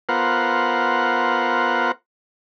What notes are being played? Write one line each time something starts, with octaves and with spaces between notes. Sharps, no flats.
B3 F4 A#4 C5 F#5